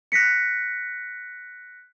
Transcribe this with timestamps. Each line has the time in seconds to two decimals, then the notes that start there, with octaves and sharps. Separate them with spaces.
0.12 F#6 A#6 B6 C#7